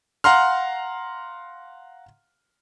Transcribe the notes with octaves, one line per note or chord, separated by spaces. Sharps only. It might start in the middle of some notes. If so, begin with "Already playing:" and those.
F5 F#5 A#5 C6 F6